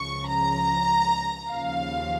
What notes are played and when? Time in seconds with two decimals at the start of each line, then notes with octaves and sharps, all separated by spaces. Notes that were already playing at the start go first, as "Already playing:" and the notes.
Already playing: C#2 C#3 F3 C#6
0.28 A#5
1.50 D#2 C#3 F3 F5